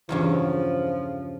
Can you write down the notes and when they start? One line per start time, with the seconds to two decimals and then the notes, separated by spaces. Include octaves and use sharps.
0.09 E2 G2 C#3 F3